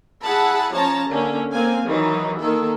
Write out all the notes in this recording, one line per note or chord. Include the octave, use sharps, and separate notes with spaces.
E4 G#4 F#5 A5 B5
F3 C#4 C#5 A5 A#5
D3 A#3 C#4
A#3 C4 F5 G#5
D#3 E3 F#3 D#4
D#3 A#3 A4